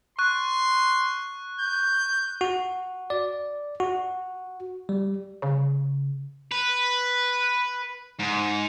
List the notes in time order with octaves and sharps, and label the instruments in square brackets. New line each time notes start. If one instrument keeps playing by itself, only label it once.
[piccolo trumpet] C6 [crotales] C#6 F#6
[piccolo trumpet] G6
[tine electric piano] F#4
D5
F#4
G3
[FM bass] C#3
[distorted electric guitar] B4
G#2